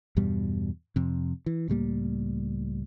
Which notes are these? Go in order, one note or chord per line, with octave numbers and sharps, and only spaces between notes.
E2 G2 B2 G3
F2 C3
E3
C#2 A2 G3 A#3